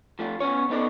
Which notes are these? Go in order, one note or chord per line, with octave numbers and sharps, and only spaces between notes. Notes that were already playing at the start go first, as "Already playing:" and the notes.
F3 A3 F4
B3 C#4 C#5
B3 D#4 A4 A#4 D5